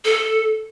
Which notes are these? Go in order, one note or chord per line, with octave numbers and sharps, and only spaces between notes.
A4